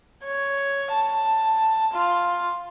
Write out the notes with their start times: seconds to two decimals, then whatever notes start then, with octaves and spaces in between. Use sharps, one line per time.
0.25 C#5
0.92 A5
1.93 F4